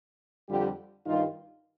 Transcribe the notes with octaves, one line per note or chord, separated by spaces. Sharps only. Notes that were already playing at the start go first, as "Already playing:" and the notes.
F2 D3 G3 F4 G4
G2 D#3 G3 D#4 F4